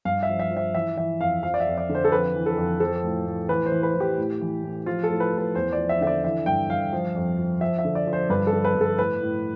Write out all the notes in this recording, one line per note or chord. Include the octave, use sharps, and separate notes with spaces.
G2 F5
E5
F3
E5
F3
E5
E3 E5
E3 E5
F2 F5
F3 F5
D5
E5
F2
D5
D3
C5
A4
F2 B4
E3
A4
F2
F3 A4
A2
A2
E3 B4
C5
E3
B4
E3
G4
A2
E3
A2
F3 F4
A4
A2
B4
A2
B4
E2 C5
D5
F3
E5
D3 E5
D5
E3 E5
G2 G5
G2 F5
F3
F2
F3
F3 E5
E5
D3
D5
F3
C5
G2 B4
A4
D3
B4
G2
A4
A2 B4
A2